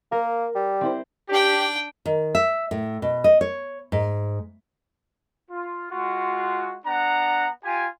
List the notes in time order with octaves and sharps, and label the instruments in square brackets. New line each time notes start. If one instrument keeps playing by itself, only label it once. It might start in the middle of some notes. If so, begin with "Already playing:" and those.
[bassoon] A#3 [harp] A#4
[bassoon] G3
[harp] C4 E4 C5
[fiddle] D4 G5 [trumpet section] G4
[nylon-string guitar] D#3
E5
A2
B2
D#5
C#5
G#2
[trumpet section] F4
G#3 F4 F#4
B3 D4 F#5 A#5
F4 G4 G#5